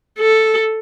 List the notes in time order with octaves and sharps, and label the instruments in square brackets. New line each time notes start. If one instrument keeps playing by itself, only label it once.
[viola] A4